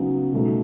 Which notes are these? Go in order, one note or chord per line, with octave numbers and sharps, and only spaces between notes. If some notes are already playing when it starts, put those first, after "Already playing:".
Already playing: C#3 F#3 B3 D#4
B2 F#3 A3 D#4